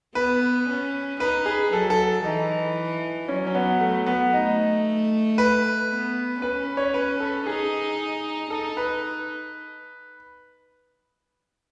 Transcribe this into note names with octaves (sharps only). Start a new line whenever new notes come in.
B3 B4
C#4
D#4 B4
G#4
F#3 A4
A4
E3 D#4
F#3 C#4
C#4
B3
A3
B3
A3 D#4
B4
B3
C#4 B4
C#5
B4
A4
D#4 G#4
D#4 A4
B4